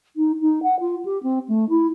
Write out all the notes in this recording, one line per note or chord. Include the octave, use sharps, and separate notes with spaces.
D#4
D#4
F#5
F4
G4
C4
A3
E4